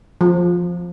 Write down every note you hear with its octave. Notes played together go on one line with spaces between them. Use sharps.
F3